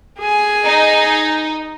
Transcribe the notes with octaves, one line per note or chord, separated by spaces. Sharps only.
G#4 G#5
D#4